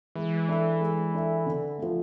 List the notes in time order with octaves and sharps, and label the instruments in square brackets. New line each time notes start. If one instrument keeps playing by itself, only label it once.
[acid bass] E3 [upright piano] G#3
[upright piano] D4 A4 E5
G#3
D4 A4 E5
D3
F3 A3